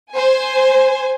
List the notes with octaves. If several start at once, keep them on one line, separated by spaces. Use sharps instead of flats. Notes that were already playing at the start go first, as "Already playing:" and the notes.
C5 G#5